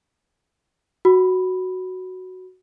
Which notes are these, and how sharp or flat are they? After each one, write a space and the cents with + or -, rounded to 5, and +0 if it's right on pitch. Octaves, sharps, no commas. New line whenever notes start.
F#4 +0 B5 +0